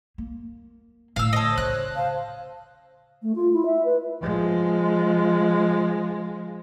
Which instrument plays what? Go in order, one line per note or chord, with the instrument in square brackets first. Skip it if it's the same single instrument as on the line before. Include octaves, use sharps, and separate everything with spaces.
[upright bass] A#3
[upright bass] A2 D3 [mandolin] F5 E6
[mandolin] A4 D#5 [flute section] C5 C#5
[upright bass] C#3 [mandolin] F#6
[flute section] C5 F5 A5
[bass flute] A3
F4
E4
E5
B4
[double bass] F3 G#3